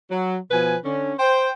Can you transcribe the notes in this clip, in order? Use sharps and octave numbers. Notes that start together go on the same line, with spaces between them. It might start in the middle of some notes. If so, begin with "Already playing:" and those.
F#3
B2 F3 B4 G#5
D3 C#4
C5 G5